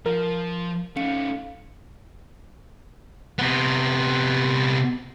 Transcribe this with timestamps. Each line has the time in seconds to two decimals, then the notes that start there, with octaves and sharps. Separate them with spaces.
0.06 F3 A#4
0.96 A3 C#4 D#4 F5 C#7
3.39 C3 B3